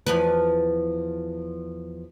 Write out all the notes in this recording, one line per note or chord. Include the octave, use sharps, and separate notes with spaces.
E2 F3 B4